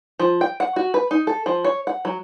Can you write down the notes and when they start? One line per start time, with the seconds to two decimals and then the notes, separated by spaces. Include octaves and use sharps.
0.19 F3
0.41 G5
0.60 F#5
0.76 F#4
0.94 B4
1.11 D#4
1.27 A4
1.46 F3
1.65 C#5
1.87 F#5
2.05 F#3